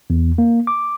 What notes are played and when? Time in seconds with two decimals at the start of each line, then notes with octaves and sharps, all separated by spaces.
0.10 E2
0.38 A#3
0.67 D6